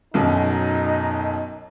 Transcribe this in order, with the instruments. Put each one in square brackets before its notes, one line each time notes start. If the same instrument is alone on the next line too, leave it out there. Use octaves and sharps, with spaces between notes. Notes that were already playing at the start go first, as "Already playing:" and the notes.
[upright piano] B1 F#2 B2 [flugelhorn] D#4